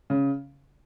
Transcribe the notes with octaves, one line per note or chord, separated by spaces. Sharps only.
C#3